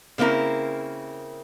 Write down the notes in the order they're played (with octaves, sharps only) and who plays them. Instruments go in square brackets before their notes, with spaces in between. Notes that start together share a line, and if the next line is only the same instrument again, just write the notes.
[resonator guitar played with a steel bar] C#3 A#3 C4 E4 A#4